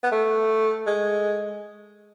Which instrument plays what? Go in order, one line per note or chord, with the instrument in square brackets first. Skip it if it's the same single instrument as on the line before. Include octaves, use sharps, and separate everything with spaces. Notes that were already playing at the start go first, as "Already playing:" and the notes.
[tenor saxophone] B3
A3
G#3